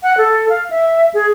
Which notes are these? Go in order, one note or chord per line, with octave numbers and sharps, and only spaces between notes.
F#5
A4
F5
E5
G#4